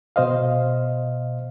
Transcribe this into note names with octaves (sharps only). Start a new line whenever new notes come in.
B2 C5 D#5 F5